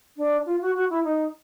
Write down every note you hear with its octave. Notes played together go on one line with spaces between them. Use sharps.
D4
F4
F#4
F#4
E4
D#4